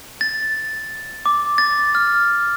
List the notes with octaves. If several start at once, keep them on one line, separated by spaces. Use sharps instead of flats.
A6
D6
A6
F6